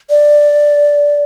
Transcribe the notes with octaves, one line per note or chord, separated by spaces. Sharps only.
D5